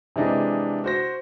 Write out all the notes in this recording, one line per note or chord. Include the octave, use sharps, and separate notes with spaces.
C3 E3 G#3 D4 D#4
F#4 C5 A#6